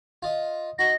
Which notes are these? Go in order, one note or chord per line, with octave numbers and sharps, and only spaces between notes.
F4 D#5
D#4 F#4 A#6